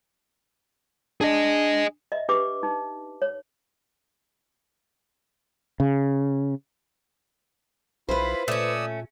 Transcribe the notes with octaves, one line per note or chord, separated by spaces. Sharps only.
D4 G#4 D#5
D#5 E5
D4 G4 B4 D6
D#4
C#5
C#3
B1 E4 F4 B4 C5 B5
A#2 A3 C#4 D5 D#6 E6